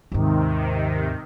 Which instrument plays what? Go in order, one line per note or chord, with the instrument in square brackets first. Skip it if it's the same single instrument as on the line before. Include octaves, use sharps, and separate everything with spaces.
[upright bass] D#2 G#2 [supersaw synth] C3 D#3